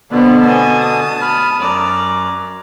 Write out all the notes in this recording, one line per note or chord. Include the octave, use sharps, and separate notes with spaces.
B2 D3 B3 C4 D4 B4
D#5 G#5 A5
D#6
B5 F6
F#2 D5 A#5